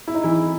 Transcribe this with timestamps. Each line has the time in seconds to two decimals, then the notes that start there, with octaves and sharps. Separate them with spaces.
0.08 E4
0.15 D#4
0.24 E3 E4